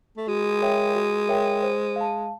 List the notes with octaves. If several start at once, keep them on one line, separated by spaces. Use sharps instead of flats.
A3
G#3 F#4
A#4 C#5 E5 G5
F#4
A#4 C#5 E5 G5
C5
F5 A5